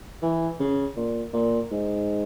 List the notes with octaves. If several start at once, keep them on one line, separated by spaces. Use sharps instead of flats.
E3
C#3
A#2
A#2
G#2